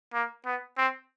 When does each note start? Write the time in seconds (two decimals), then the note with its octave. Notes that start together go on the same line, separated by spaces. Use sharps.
0.14 A#3
0.46 B3
0.78 C4